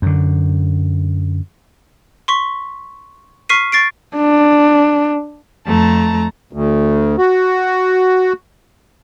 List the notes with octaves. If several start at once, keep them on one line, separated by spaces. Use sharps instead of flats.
F#2 D3
C6 C#6 B6
C#6 F6 B6 C7 D#7
C#6 A6 C7 D7
D4
F2 A3 A5 A#5
D2
F#4